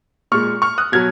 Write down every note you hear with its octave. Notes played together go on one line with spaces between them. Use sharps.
A#2 G#3 C#6 F6
C#6 F6
D#6 F#6
B2 F#3 F6 G#6